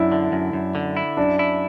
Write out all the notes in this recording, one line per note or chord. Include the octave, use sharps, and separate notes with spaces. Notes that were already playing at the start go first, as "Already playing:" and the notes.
Already playing: F#2 D4 E4
D3
F#2
F#2
D3
E4
F#2 D4
E4